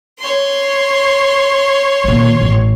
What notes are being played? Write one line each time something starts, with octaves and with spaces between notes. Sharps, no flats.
C#5 C6
A#2 D#3
A1